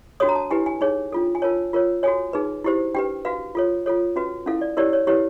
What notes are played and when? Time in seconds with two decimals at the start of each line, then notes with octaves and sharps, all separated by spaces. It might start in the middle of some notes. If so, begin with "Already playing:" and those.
0.20 D4 F#4 A4 C#5 D#6
0.29 A#5
0.35 A5
0.51 E4 G4 B4 G#5
0.66 G#5
0.81 D#4 G#4 C#5
1.12 D4 F4 A4
1.35 G#5
1.42 F4 A#4 C#5 A5
1.73 F4 A#4 C#5
2.03 F#4 A4 C#5 G#5
2.33 D#4 G#4 B4
2.64 E4 G4 C5
2.95 D4 G4 B4 G5
3.25 F#4 B4 F5
3.55 F4 A4 C#5
3.86 F4 A4 C#5
4.16 C#4 F#4 B4
4.46 C#4 E4 A4 F5
4.61 D5
4.77 E4 G4 A#4 C#5 D5
4.93 C#5
5.07 E4 G4 B4 C#5